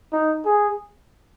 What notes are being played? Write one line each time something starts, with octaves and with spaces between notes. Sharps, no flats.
D#4
G#4